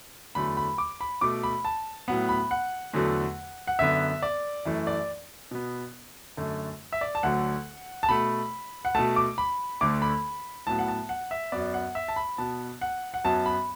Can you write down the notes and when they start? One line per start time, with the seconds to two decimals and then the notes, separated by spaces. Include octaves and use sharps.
0.35 E2 D3 F#3 A3 B5
0.57 B5
0.78 D6
1.01 B5
1.21 B2 A3 D6
1.44 B5
1.65 A5
2.08 A2 F#3 B3 F#5
2.29 B5
2.51 F#5
2.93 E2 D3 F#3 A3
3.67 F#5
3.79 F#2 D3 B3 E5
4.23 D5
4.65 F#2 E3 A3
4.87 D5
5.51 B2 B3
6.37 F#2 D3 A3
6.93 E5
7.01 D5
7.15 A5
7.23 D2 D3 F#3 A3 F#5
8.03 A5
8.09 B2 A3 B5
8.85 F#5
8.95 B2 A3 A5
9.16 D6
9.38 B5
9.81 D2 D3 A3 D6
10.02 B5
10.67 A2 F#3 B3 A5
10.79 F#5
10.88 A5
11.09 F#5
11.31 E5
11.52 F#2 F#3 B3 D5
11.74 F#5
11.95 E5
12.08 A5
12.16 B5
12.38 B2 B3 A5
12.81 F#5
13.14 F#5
13.24 F#2 F#3 B3 A5
13.46 B5